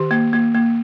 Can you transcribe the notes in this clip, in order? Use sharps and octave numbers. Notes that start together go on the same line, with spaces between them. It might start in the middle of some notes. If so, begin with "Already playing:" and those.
Already playing: D#3 G4
A#3
A#3
A#3